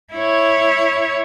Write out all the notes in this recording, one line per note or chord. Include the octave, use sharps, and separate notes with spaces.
E4 C#5